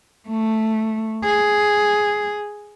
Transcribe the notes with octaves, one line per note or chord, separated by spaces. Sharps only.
A3
G#4